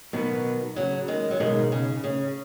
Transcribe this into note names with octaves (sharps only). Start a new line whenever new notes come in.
B2 D#3 F#3 B3 F#4 B4
C#3 F#3
D#3 G#3
F#3
B2 D#3 G#3 B3 D#4 G#4
C#3
C#3